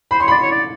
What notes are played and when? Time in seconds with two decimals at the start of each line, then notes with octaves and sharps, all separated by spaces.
0.11 C5 B5
0.20 C#5 C6
0.28 D5 B5
0.42 C#5
0.51 D5